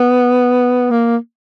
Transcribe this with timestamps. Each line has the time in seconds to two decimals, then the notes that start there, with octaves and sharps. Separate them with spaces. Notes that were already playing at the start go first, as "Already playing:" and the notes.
Already playing: B3
0.91 A#3